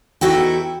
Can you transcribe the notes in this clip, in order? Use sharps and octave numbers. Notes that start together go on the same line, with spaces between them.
E2 D#4 E4 F#4 A4 G5